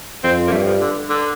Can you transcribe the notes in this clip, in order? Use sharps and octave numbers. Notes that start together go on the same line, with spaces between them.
F2 C4
A#3
G2 A3
F3
D3
D3